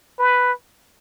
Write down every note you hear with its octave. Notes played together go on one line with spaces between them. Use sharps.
B4